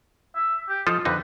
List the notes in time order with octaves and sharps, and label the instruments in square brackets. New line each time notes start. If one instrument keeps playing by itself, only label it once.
[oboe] E5
G4
[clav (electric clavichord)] F3 F4 A4 [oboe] D#5
[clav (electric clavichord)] F2 D3 D#4 [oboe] B4